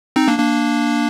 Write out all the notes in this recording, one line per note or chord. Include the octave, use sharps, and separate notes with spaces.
C4 D#4
A#3 D4
A#3 D4